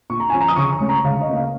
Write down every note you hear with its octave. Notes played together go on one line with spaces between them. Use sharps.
A#2 C#6
A#5
F3 C#4 G#5
A#5
D#6
C#3 C#6
C#6
G#3 C#4
A#5
C#3 F5
D#5
A#3 C#4
F5